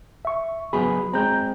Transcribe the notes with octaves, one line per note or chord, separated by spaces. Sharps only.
E5 C#6
F#3 B3 G#4 B5
G#3 C4 A#5 G6